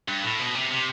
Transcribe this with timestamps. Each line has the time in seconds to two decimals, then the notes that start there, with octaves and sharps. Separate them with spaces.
0.08 G2
0.24 A2
0.40 B2
0.55 C3
0.71 C3